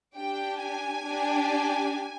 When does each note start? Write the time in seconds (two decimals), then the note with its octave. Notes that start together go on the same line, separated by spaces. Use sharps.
0.17 D4 G4 G5
0.62 G#5
1.07 D4 G4